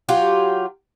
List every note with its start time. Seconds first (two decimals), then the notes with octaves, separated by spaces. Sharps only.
0.09 F#3 F4 G4